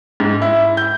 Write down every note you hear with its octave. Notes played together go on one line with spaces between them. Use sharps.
G#2
E4
G6